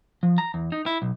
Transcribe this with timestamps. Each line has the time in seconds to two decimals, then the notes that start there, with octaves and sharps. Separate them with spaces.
0.23 F3
0.38 A#5
0.54 E2
0.72 D#4
0.86 E4
1.02 B1